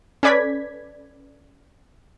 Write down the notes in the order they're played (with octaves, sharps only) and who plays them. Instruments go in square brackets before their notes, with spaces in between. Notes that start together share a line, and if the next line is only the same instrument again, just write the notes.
[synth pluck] C#4 A4 B4 D5 G#6 B6